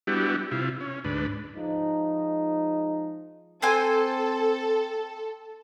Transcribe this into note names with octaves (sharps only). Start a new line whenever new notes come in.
G3 B3 D4 E4 F#4 G4
C3 E4 F4
C#4
D2 G#2 D4 B4
F3 G#3 D#4
C4 A4 C5 G#5